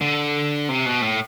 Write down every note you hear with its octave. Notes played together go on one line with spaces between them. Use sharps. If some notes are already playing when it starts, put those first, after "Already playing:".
D3
C3
B2
A2